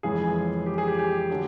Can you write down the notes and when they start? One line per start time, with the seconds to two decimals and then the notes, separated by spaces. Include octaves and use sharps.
0.03 F2 C#3 E3 G#3 G#4
0.66 G4
0.78 G#4
0.88 G4
0.99 G4
1.30 D3 F#3 A3